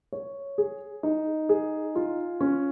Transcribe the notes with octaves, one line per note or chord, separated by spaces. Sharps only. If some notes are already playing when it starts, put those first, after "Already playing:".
C#5
G#4
D#4
G#4
F4
C#4